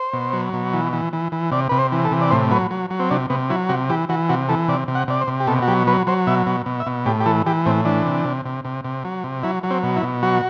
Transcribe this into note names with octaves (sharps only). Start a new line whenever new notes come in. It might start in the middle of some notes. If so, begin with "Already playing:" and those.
Already playing: C5
B2
F#3
B2
E3
E3
E3
E3
C3 D5
C3 B4
C5
E3
A4
C3
D5
A2 C5
F#3 B4
F#3
F#3
C4
C3 D4
C3 B3
F#3 E4
C3 F#4
E3 G4
E3 F#4
C3 F#4
E3 A4
C3 D5
C3
F#5
C3 D5
C5
C3
G4
B2 A4
F#4
F#3 G4
F#3 B4
F#3 C5
B2 E5
B2
B2
E5
B2
A2 G4
G4
E3 A4
E3 G4
A2 C4
E3 D4
C3
C3
C3
C3
C3
F#3
C3
F#3 E4
F#3
C4
B2
E4
B2
F#3 F#4